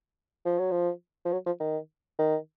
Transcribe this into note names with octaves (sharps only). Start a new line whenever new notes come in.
F3
F#3
F3
F3
F#3
F3
D#3
D#3